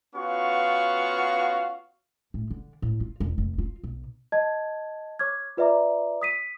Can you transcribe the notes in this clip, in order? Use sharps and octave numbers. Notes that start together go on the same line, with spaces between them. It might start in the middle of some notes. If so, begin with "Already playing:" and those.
B3 C#4 F4 F#4 F5 C#6
A2
D3
A2
F4
E1
F1
F4
B1
D#5 A5 G#6
C#5 C#6 D6 F6 G#6
F4 B4 D5 E5 A#5 D6
D#6 B6 D#7